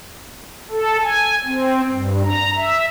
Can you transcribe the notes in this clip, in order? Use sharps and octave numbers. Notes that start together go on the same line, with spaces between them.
A4
G#5
C4
G2
A#5
E5